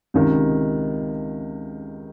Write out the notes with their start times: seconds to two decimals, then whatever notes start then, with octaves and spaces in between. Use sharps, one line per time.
0.14 C#2 C3 D#3